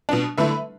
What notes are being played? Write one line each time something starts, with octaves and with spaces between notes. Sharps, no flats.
B2 B3 D4
D3 A3 E4 B4 E5